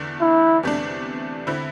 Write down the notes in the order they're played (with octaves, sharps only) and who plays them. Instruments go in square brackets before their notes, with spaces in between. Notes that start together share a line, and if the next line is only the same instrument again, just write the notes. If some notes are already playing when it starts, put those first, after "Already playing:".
Already playing: [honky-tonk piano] E2 D3 A3 D4
[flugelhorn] E4
[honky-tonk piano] E2 C3 A3 D4
D3 C4 E4